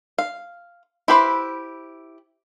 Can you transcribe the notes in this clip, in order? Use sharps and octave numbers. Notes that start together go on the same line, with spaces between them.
F5
E4 G4 B4 C5